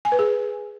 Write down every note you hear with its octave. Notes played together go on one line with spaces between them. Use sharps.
G#5
B4
G#4